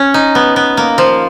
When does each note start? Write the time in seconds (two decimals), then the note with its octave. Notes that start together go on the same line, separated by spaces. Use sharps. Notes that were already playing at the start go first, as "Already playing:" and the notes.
Already playing: C#4
0.14 D#4
0.35 B3
0.56 B3
0.77 A#3
0.98 F3